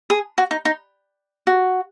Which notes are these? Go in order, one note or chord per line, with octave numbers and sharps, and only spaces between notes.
G#4
F#4
D#4
D#4
F#4